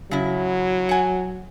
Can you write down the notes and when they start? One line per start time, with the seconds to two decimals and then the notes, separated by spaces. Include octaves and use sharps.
0.11 C#3 F#3 E4
0.89 F#5 G#5